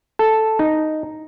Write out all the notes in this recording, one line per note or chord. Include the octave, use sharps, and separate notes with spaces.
A4
D#4